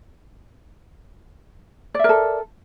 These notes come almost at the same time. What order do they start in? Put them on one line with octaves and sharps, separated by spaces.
D5 E5 A#4 A4